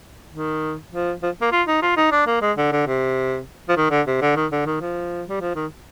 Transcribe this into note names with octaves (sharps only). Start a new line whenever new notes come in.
D#3
F3
F3
A#3
F4
D#4
F4
D#4
D4
A#3
G#3
D3
D3
C3
F3
D#3
D3
C3
D3
D#3
D3
D#3
F3
G3
F3
D#3